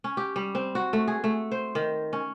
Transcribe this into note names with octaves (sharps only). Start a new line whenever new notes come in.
C#4
G4
G3
C4
F#4
A3
G#4
A3
C5
D#3
C#4